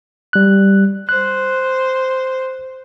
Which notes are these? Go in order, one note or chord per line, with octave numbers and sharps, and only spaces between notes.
G3 F#6
C5 F#6